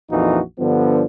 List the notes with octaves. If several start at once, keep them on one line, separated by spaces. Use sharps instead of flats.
A#1 F2 E3 D#4 F4 F#4
G2 D3 F3 G3 B3